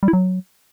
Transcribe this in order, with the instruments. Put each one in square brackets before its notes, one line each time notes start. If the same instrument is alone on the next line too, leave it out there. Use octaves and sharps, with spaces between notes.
[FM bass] G3
E4
F#3